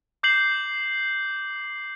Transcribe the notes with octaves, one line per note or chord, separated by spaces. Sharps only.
D6 G6 C7 F#7